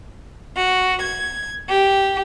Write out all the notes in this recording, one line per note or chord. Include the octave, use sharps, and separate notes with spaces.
F#4
G#6
G4